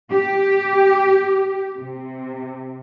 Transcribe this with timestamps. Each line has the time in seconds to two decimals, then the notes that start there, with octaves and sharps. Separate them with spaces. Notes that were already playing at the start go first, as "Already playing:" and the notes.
0.11 G4
1.79 C3